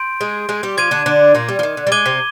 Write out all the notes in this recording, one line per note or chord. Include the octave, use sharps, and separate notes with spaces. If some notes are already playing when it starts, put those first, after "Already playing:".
Already playing: C6 G6 D7
G#3 G#4
G#3 G#4
G3 G4
F3 F4 D6 G#6 D#7
D3 D4
D3 D4
A#2 A#3
G3
F3
D#3
D3
G3
G#3 D6 G#6 D#7 G7
C3 C4